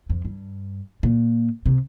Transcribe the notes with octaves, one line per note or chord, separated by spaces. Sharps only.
F2
G2
A#2
C3